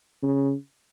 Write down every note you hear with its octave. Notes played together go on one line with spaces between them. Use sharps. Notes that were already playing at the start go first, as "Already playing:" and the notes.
C#3